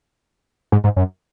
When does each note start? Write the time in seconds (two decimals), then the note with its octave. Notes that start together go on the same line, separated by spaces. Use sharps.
0.72 G#2
0.84 G#2
0.96 F#2